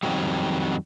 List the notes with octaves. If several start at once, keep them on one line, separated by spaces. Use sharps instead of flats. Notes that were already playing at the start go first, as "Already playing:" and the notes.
F2 G#2 D#3 F#3 G3